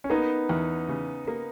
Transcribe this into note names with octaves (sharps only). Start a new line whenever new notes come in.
C#4
A#3 B3 D#4
E2
C#3
A#3